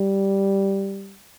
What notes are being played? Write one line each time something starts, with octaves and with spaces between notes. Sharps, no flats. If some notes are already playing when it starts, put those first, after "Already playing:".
Already playing: G3